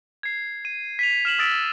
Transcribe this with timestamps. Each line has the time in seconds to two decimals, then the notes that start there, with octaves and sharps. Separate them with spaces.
0.23 G#6 C7
0.65 D#7
0.99 B6 D#7 F7
1.25 F6 E7 F#7
1.39 D#6 E6 A6 B6 D7 F#7